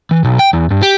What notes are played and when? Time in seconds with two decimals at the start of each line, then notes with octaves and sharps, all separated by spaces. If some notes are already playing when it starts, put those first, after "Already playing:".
0.11 E3
0.24 B1
0.39 G5
0.53 E2
0.71 G2
0.83 G4